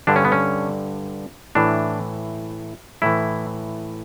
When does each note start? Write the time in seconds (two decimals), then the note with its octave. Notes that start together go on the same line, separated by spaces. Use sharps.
0.07 G2 D3 D4
0.16 C#4
0.25 B3
0.32 C#4
1.55 A2 E3 D4
3.02 A2 E3 E4